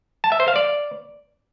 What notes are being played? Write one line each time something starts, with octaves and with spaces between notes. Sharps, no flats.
A5
E5
C5
F5
D5